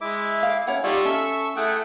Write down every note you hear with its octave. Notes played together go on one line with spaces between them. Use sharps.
G#3 E4 E5 D6
F5
C#4 E4 C#5 F#5
G3 D#4 F4 G4 D5 C#6 E6
C#4 A4 E5
A3 E4 G#4 F#5 G5